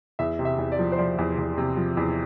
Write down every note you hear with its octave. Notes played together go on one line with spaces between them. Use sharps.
E2 E5
C3
E5
E2
D5
F3
C5
F3 D5
E2
E2
C3
F3
E2